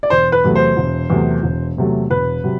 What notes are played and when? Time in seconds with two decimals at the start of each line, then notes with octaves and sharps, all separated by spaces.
0.03 D5
0.10 E1 C5
0.32 B4
0.44 E2 C3 F#3 A3
0.55 C5
0.77 E1
1.10 E2 C3 F#3 A3
1.43 E1
1.77 E2 C3 F#3 A3
2.10 E1 B4
2.44 C3 F#3